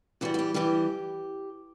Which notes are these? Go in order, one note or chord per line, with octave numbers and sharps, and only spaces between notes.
G2 E3 G3 F#4
F#4
G4
G2 E3 G3 G4